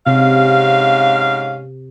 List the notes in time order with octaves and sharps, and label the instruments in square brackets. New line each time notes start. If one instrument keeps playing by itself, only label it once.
[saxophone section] G#2 C#4 F5 [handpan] C3